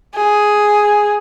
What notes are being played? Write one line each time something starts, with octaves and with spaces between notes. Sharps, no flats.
G#4